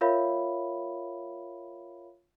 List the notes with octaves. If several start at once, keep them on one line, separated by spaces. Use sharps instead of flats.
F4 A#4 C#5 E5 F5 B5